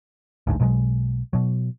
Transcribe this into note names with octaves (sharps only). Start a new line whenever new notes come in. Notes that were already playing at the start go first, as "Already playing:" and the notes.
A1 D2 G#2
B1 B2 F#3 G#3
B2 F#3